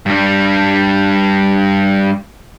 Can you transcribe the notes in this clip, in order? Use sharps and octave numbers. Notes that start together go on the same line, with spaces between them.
G2 G3